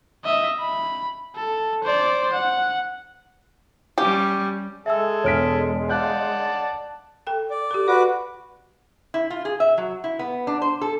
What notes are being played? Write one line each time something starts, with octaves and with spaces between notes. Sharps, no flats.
D#5 E5
B5
A4
C5 D5
F#5
G3 C#4 G4
G#3 G#4 A4 E5 E6
E1 C#5 F6 B6 D7
D5 F5 F#5 A5 F#6 G6
A4 G5
D5
G4 A4
F#4 B4 D5 D6
E4
F4
G#4
E5
F#3
E4
B3
D4
C5
A4